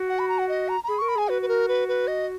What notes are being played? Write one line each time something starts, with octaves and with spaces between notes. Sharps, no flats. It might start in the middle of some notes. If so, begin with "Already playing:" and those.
Already playing: F#4
F#5
B5
A#5
F#5
D#5
A#5
A#5
G#4 B5
A#4 C#6
B5
G#4 G#5
F#4 B4
B4
A#4
B4
B4
D#5